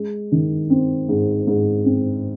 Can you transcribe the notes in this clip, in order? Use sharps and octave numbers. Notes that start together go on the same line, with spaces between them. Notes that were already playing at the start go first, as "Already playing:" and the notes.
Already playing: G#3
D#3
C4
G#2
G#2
C4